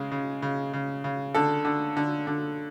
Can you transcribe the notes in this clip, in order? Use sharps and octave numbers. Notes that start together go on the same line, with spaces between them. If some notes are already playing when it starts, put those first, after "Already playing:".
Already playing: C#3 G#3
C#3
C#3
C#3
C#3
D3 A4
D3
D3
D3